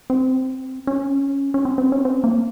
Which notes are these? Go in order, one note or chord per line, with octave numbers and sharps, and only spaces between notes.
C4
C#4
C#4
C4
C4
C#4
C4
A#3